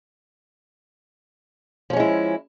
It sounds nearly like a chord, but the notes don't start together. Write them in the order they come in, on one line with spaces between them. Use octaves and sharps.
F3 C#4 G#3 E4